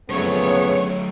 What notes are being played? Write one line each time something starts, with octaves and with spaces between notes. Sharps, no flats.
A#1 F2 C#3 F#3 A3 B3 C#5